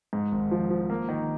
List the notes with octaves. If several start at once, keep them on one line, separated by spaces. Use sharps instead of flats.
G#2
G#1
F3
F3
A#3
D#3